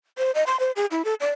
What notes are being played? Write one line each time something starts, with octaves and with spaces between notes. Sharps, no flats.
C5
D#5
C6
C5
G#4
E4
A4
D5